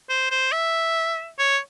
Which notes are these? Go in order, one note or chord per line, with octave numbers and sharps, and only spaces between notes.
C5
C5
E5
C#5